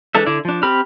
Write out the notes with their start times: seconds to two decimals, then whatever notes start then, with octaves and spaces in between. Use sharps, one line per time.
0.15 E3 G#3 D4 A4 E5
0.26 D3 E4 D5
0.45 F3 D4
0.63 C4 G4 B5 F6